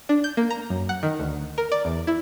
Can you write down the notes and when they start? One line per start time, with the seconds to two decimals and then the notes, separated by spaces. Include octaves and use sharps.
0.09 D4
0.24 G6
0.37 A#3
0.50 A#5
0.70 F#2
0.89 F#5
1.03 D#3
1.20 D2
1.58 A#4
1.72 D5
1.85 E2
2.07 E4